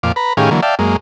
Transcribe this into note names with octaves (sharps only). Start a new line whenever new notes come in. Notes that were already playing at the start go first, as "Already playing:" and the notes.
F2 A#2 F5 D6
B4 A#5 B5
A2 D#3 C#4 G4 G#4 F5
D3 E3 F#3 A#3
D5 E5 F5 G5 A5
F#2 G#3 A#3